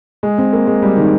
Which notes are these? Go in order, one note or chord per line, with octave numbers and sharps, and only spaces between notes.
G#3
C4
A#3
G#3
G3
D#3